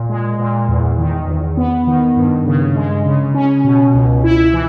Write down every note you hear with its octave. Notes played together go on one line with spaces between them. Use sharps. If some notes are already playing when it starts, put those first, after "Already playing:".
Already playing: A#2
G#3
A#2
E2
D#3
E2
B3
D#3
G2
C#3
G#3
C#3
C#4
B2
C#2
E4
E3